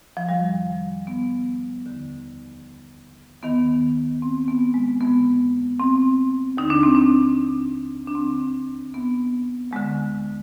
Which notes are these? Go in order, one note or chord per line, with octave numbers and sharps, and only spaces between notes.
F3
F2 D#3 G3
B3
D#2 D3
D#2 D#3 B3
C4
B3
G#3
F2 D3 B3
C4
D#2 D3 D#4
D4
C4
D4
D4
D2 D3 C4
B3
D2 D3 G#3